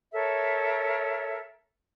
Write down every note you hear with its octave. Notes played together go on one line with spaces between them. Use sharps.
A4 A#4 C#5 E5